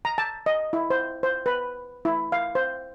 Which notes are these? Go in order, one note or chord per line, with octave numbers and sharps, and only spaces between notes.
A#5
A5
D#5
E4
C5
C5
B4
E4
F5
C5